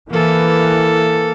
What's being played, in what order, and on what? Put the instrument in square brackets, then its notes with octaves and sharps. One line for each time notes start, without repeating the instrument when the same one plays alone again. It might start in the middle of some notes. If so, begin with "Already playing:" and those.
[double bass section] E3 [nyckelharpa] A#3 A4